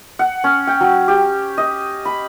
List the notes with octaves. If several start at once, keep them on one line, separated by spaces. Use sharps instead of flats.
F#5
C#4
G5
F#3
G4
D#5
B5